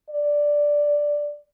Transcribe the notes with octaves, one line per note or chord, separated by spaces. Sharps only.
D5